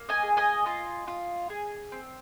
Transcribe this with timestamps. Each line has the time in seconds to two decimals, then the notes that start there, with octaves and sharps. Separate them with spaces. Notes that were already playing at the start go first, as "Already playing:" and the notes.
Already playing: A#3
0.09 D#5 G#5
0.23 G#4
0.37 D#5 G#5
0.66 F4
1.08 F4
1.50 G#4
1.92 C4